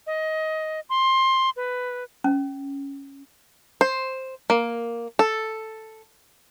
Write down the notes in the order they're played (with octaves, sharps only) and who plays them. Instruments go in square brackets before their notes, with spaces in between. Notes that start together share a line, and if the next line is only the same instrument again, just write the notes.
[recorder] D#5
C6
B4
[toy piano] C#4
[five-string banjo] C5
A#3
A4